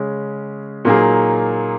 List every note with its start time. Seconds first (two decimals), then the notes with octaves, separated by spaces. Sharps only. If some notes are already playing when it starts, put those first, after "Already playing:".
Already playing: C#3 G#3 C#4
0.85 A#2 F#3 A#3 D#4 G#4